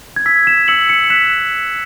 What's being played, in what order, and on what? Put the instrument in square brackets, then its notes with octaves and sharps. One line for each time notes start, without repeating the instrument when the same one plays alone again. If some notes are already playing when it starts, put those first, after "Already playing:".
[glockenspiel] G#6
E6 B6
B6 E7
E6 C#7 F#7
C#7 F#7
C#7
F#6 B6 E7